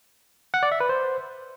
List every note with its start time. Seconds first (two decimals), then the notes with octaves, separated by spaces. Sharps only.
0.54 F#5
0.63 D5
0.72 E5
0.80 B4
0.89 C5